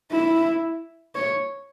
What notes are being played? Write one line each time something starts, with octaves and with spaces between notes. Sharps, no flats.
E4
C#5